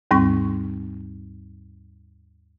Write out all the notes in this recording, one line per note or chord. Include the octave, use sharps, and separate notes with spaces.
D#2 G#2 G3 C4 C#6